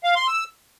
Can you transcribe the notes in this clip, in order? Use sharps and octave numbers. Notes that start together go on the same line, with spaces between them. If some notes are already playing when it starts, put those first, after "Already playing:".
F5
C6
E6